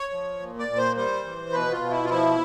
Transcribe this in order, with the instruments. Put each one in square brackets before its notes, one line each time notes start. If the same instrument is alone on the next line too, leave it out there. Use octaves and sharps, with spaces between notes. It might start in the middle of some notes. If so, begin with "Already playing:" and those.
Already playing: [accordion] C#5
F3
A#2
D5
A#2
C5
G3 C5
E3
B2 B4
F4
B2
E4
F4
F3 E4